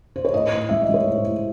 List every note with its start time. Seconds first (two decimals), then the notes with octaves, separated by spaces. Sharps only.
0.16 C5
0.25 C#5
0.34 A2 D#5
0.53 A2
0.69 G#3 E5
0.81 D#5
0.89 G#3 C#5
1.07 A2 C5
1.25 A2